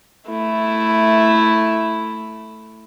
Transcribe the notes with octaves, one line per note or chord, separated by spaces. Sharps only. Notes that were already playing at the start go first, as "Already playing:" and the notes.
A3 E4